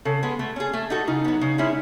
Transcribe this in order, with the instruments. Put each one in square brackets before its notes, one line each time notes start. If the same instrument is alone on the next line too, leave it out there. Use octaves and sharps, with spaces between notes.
[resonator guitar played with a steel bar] C#3 [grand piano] A4
[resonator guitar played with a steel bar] G#3 B3
A3
C#4 G#4
A3
D#4 F#4 A4
[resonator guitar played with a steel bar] C#3 [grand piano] D#4
[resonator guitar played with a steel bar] F#3 B3
C#3
G#3 C#4 E4